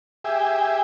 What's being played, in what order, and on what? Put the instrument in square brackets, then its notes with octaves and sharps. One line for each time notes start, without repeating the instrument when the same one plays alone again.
[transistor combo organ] G4 G#4 E5